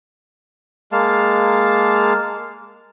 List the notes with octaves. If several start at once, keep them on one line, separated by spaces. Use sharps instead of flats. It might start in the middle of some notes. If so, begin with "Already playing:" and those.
G#3 A#3 F5 A5